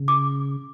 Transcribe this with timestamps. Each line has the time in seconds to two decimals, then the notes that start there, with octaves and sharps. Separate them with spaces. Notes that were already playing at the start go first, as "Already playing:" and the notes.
Already playing: C#3
0.08 D6